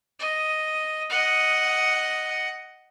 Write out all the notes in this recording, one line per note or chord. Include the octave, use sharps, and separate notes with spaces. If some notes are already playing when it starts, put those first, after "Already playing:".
D#5
D#5 F#5